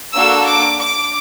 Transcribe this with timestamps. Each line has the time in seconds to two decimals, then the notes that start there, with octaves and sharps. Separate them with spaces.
0.15 A#3 D4 F#4 A4 E6
0.48 D6
0.82 D6